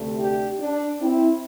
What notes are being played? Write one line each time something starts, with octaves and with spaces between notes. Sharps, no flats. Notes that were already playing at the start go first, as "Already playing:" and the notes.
Already playing: D2 C3 A3
D4 G4
D4
C4 E4